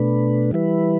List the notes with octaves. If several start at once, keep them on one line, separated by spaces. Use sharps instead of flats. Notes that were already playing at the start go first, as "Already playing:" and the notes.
Already playing: B2 A3 D4 B4
E3 G3 E4 B4